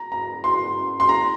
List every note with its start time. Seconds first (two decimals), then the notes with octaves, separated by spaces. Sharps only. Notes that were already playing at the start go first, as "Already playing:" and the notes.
Already playing: A#5
0.12 A#5
0.44 C6
1.00 C6
1.09 A#5